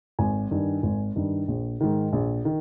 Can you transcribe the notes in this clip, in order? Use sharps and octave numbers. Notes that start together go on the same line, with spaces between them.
G#1 G#5
G2 D#3
G#1
G2 D#3
A#1
G#2 D#3
A#1
D#3